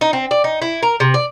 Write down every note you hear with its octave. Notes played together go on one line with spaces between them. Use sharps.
D#4
C4
D5
D#4
E4
A#4
C3
D5